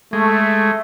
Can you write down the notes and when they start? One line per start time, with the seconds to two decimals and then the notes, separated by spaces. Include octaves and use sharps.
0.13 G#3 A3